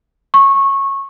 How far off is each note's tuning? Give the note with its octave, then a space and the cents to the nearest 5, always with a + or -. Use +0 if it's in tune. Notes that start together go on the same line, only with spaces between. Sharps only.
C#6 -15